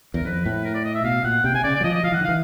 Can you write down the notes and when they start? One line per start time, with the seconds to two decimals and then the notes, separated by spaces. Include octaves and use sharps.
0.14 E2 A#4
0.25 F2 B4
0.45 A2 B4
0.65 A#4
0.74 D5
0.85 D#5
0.95 E5
1.04 B2 F5
1.24 A#2 F#5
1.44 C3 G5
1.54 C3 G#5
1.64 C#3 D5
1.75 D5
1.81 F#3
1.84 F3 D#5
1.94 D#5
2.04 F3 F5
2.12 E3 F#5
2.21 D#3
2.24 F5
2.29 E3